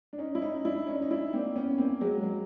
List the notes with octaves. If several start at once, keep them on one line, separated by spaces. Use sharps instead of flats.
D4
C#4 D#4
E4
C#4 D#4
D4 E4
C#4 D#4
D#4
D4 E4
A#3 C4
B3 C#4
A#3 C4
F#3 G#3
F#3